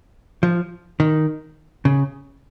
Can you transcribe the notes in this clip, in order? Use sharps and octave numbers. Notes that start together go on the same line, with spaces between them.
F3
D#3
C#3